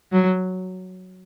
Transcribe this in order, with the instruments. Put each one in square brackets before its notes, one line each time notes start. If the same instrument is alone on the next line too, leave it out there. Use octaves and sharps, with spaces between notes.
[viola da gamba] F#3